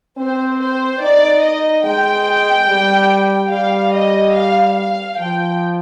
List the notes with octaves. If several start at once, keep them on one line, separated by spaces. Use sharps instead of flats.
C4 C5
C5
D#4 D5
D#5
G#3 G5
G3
G3 F5
D#5
F5
F5
F3 G5